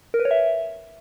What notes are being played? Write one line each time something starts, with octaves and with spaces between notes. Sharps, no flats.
A#4
B4
C#5
E5